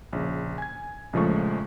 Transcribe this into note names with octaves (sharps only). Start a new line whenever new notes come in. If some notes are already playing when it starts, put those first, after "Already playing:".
A#1 C#3
G#5 G#6
A#1 C#3 F3 G#3 A3 C#6